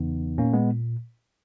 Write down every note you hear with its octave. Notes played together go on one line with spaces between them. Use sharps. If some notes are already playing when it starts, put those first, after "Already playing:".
Already playing: E2 C#3 E3 B3 D#4
A#2 A#3 C#4
G#3 B3